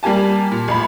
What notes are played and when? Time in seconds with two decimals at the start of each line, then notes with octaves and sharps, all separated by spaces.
0.03 G3 A#3 G4 G#5 A5
0.52 A#2
0.68 A1 B5